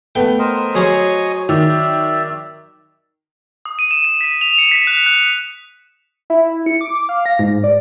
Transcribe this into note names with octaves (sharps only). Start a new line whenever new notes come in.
A3 B3 G5
A#4 C5 D#5
F#3 G#4 C5 C#5 D#5 G#5
D#3 D5 E5
D#6
D#7
E7
D#7
B6
F7
C#7
B6
F#6
F#6
E4
C#7
D6
F5
A#6
G#2
D5